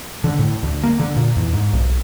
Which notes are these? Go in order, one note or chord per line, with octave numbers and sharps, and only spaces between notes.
D3
A2
D2
A#3
D3
A#2
E2
G#2
B1